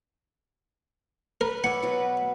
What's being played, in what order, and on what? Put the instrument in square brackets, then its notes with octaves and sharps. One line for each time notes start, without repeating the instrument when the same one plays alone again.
[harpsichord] A#4 [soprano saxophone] B4
[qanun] C#5 D5 E5 [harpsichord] F#5
[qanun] B2 F#3